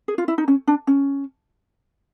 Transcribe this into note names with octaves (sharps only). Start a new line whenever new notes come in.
G#4
F4
E4
D#4
C#4
D4
C#4